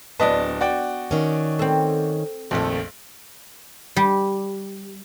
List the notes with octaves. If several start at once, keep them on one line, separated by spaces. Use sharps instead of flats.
D1 B3 D4 D#5 A5
F#4 D5 G5
D#3 C#4
C4 A4
A#1 F2 D#3 F3 A3
G3